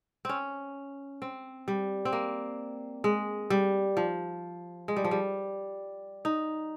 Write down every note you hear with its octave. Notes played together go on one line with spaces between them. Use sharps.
C4 C#4
C4
G3
C4
A#3
G#3
G3
F3
G#3
G3
F3
G3
D#4